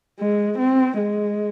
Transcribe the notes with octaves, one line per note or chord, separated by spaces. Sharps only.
G#3
C4
G#3